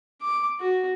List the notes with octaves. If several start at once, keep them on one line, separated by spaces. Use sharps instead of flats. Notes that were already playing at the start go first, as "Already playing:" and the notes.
D6
F#4